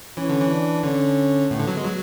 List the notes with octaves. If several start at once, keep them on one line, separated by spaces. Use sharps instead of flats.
E3 C#4
D3
E3
D4
D3 C#4
A2 B3
D3
F#3
G#3
F#3